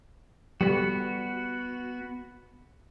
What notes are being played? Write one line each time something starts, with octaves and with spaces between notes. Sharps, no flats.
G3 B3 F#4